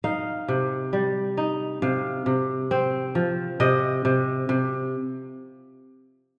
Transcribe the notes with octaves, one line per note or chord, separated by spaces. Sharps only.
D#4 F5
C3
G3
D#4
C3 F5
C3
C4
F3
C3 D#5
C3
C3